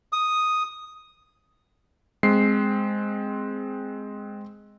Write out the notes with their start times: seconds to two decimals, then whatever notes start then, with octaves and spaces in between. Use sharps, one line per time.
0.13 D#6
2.23 G#3 C4 C7